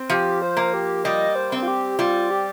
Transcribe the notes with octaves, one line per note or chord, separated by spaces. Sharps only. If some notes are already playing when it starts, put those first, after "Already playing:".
Already playing: C4
F3 G4
C5
A#3
G4
G3 D#5
C5
C4
F4
G4
G3 F4
G4